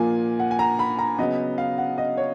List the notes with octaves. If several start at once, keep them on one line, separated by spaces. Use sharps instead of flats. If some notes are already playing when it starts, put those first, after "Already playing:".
Already playing: A#2 F3 A#3 G#5
F#5
G#5
A#5
B5
A#5
C#3 F#3 B3 D#5
F5
F#5
D#5
C#5